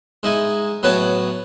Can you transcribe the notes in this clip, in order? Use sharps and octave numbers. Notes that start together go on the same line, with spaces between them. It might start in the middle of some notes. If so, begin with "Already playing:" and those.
G#2 D#4 E4 G#5
A2 F#3 B3 B4 C#5 A5